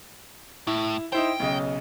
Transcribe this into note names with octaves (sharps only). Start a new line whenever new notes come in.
A2 E4
D#4 E4 C5 G5
B1 C#3 D#5